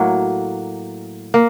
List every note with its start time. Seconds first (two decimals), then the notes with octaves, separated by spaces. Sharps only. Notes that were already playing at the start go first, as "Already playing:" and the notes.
Already playing: A2 F#3 A#3
1.34 A#3